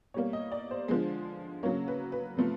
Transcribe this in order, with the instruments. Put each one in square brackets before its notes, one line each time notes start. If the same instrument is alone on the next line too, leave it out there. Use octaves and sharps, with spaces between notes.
[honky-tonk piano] B2 G3 A#3 C#5
D#5
D5
C5
D3 F3 G#3
C#3 F#3 A#3 C#5
B4
B4
C3 F3 A3